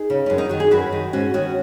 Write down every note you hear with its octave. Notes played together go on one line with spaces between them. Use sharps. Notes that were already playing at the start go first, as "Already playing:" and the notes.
Already playing: D#4 G#4
C#3
F#2 C#4
D#4
D#3 F#4
G#4
F#2 F#4 B4
D#3
G#2 C#4 F#4
D#3 C#4 F#4